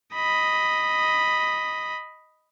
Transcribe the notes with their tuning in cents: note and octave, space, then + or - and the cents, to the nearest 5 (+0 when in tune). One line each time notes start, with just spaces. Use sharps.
D#5 +0 B5 +0